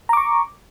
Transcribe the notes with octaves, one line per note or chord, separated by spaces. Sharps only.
A#5 C#6 D6